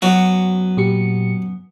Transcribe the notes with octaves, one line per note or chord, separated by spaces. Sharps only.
F#2 F#3 B3 F#4
A#2 G4 C#7